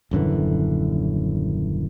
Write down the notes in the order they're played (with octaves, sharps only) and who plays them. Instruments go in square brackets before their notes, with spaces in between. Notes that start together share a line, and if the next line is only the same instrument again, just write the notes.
[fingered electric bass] D#1 F#2 D3 E3